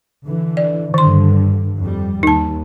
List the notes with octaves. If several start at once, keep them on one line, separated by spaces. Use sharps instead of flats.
D3 E3
D5
G2 D3 D#3 C6
F2 G3
D#2 D#4 A5